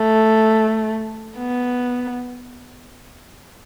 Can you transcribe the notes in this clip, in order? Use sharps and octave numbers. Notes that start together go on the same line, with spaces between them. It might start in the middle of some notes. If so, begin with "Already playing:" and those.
Already playing: A3
B3